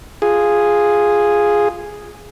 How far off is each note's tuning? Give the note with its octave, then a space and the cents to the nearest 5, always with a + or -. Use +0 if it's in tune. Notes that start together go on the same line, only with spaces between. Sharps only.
F4 +0 G#4 -5